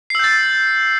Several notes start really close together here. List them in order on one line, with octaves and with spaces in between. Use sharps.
C7 E6 G6 A6